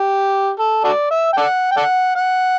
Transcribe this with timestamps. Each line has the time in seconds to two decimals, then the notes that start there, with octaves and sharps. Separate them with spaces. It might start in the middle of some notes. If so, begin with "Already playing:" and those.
Already playing: G4
0.59 A4
0.84 F#4 A4 D5
1.11 E5
1.33 G5
1.37 A4 D5 F#5
1.71 G5
1.77 A4 D5 F#5
2.16 F#5